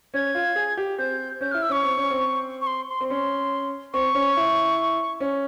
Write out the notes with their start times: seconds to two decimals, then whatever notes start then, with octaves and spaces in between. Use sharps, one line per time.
0.14 C#4 G#6
0.35 F4
0.56 G#4
0.77 G4
0.98 C4 G6
1.41 C#4 G6
1.52 F6
1.54 E4
1.62 E6
1.69 C#4 C#6
1.84 C4
1.97 C#4
2.11 C4
2.61 C#6
2.67 C6
2.89 C6
3.01 C4
3.09 C#4 C6
3.94 C4 C#6
4.15 C#4
4.37 E4
5.20 C#4